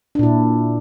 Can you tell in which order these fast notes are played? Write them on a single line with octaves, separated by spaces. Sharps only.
D4 A#2 E4